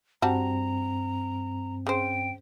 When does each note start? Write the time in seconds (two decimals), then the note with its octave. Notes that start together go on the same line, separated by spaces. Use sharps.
0.22 G2 G3 C4 F#4 A5 A#5
1.87 C#3 C5 G5